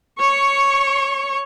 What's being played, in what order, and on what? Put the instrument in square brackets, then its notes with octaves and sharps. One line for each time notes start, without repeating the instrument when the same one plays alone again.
[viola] C#5 C#6